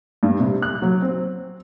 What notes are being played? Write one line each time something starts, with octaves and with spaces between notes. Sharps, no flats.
G2
C3
F#6
F#3
C4